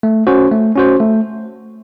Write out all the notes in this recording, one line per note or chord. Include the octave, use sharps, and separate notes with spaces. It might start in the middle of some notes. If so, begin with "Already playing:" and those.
A3
C#4 F#4 C5
A3
C#4 F#4 C5
A3